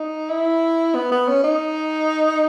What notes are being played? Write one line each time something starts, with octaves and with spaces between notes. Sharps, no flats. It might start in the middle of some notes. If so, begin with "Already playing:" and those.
Already playing: D#4
E4
B3
B3
C#4
D#4